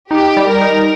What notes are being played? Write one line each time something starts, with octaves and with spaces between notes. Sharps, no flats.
D#4 G4
G3
A#4
D#4